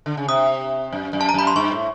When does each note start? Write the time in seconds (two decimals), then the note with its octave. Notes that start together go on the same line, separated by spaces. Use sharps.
0.06 D3
0.17 C#3
0.28 C3 D#6
0.93 F#2
1.13 F#2
1.21 A5
1.29 A#5
1.34 F#2 B5
1.47 C6
1.56 G2 C#6
1.72 A2